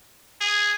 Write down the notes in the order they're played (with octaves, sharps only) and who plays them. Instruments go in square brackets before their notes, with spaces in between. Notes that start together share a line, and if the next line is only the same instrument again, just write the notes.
[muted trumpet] G#4